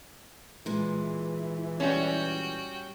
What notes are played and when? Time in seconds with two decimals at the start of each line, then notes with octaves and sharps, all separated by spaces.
0.66 A#2 E3 G#3
1.80 G3 C#4 F#4 G5